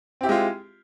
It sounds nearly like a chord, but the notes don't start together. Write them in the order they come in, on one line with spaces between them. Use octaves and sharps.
C4 G4 E4 G#3 F4